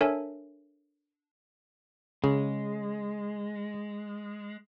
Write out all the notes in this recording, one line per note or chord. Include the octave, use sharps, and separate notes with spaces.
D4 A4 A#4 C#5 E5 G#5
C#3 G#3